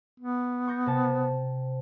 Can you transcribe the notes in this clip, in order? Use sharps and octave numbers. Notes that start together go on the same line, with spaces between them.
B3
C#6 G6 A#6
C3 A5